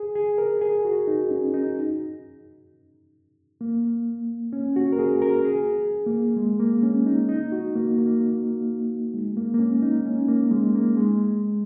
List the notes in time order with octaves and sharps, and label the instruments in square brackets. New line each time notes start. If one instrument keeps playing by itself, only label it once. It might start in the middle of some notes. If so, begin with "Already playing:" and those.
Already playing: [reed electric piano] G#4
G#4
A#4
G#4
F#4
D#4
C#4
D#4
A#3
C#4
F#4
A#4
G#4
A#4
G#4
A#3
G#3
A#3
C#4
D#4
D#4
F#4
A#3
A#3
A#3
G#3
A#3
A#3
C#4
D#4
C#4
A#3
G#3
A#3
G#3